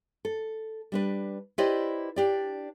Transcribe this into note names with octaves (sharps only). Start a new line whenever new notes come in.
A4
G3 D4 B4
E4 G4 B4 C5 D5 D#5
D4 G4 D5